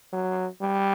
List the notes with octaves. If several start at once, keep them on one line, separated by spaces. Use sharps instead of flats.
F#3
G3